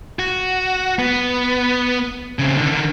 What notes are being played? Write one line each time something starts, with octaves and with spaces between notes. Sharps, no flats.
F#4
B3
C#3 C4
D3 D#3